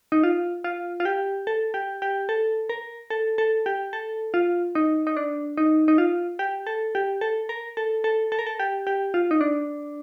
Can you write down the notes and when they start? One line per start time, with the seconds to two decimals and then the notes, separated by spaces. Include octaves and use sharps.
0.12 D#4
0.23 F4
0.64 F4
1.00 F4
1.05 G4
1.47 A4
1.74 G4
2.02 G4
2.29 A4
2.69 A#4
3.10 A4
3.38 A4
3.66 G4
3.93 A4
4.34 F4
4.75 D#4
5.07 D#4
5.17 D4
5.57 D#4
5.88 D#4
5.98 F4
6.39 G4
6.67 A4
6.95 G4
7.21 A4
7.49 A#4
7.77 A4
8.04 A4
8.32 A4
8.39 A#4
8.46 A4
8.60 G4
8.87 G4
9.14 F4
9.31 D#4
9.41 D4